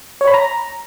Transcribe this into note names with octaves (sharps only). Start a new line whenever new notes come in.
C#5
B5
A#5